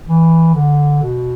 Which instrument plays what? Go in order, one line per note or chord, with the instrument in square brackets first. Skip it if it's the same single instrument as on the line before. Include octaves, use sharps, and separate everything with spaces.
[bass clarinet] E3
D3
B2